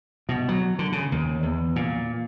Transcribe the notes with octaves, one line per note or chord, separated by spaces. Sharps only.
B2
F#3
D3
C#3
D#2
E2
A#2